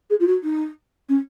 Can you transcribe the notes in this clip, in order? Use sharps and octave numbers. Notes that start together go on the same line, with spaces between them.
G#4
F4
F#4
D#4
C#4